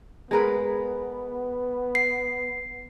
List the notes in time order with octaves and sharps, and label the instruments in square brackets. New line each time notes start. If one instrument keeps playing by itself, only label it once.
[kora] G#3 A#4 B4 [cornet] B3
[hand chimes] C7